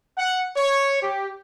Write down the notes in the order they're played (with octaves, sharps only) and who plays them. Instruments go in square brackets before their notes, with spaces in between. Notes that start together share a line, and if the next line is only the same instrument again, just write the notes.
[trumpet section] F#5
C#5
G4